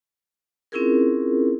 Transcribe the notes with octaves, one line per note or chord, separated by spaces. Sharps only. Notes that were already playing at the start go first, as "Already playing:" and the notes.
C4 C#4 E4 F4 G#4 A#4